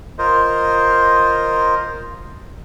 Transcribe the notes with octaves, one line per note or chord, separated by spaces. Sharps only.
F4 A#4 C5 D#5